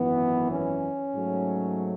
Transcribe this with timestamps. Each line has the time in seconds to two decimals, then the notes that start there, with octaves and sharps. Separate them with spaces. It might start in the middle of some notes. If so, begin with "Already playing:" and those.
Already playing: G#1 F#2 E3 B3
0.50 C#4
1.14 G#2 F#3 A3